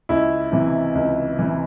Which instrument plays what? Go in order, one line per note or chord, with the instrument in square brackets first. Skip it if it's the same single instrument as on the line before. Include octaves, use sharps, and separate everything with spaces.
[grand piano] C#2 E4
C3 E3
C#2
C3 E3